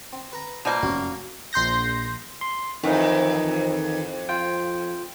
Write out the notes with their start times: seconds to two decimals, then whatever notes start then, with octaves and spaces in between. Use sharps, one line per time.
0.13 C4
0.33 B4 A#5
0.65 B2 F3 G3 A#3
0.83 F1 F#2 C#4 F#4 C#5
1.53 A#1 C6 G6 A#6
2.41 C6
2.83 F2 D#3 E3 D#4
4.29 F4 G5